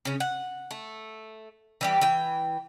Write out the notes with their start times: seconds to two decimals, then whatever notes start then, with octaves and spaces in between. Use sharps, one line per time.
0.05 C#3 C#4
0.20 F#5
0.71 A3
1.81 E3 G3 G4
2.01 E3 G5